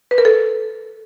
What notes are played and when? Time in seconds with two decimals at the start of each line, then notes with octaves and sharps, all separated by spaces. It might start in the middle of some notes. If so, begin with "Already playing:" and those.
0.11 B4
0.18 A#4
0.25 A4